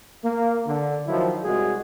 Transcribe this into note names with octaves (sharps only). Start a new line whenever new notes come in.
A#3
D3
D#3 F3 F#3 E4
C2 G#3 F#4 G#4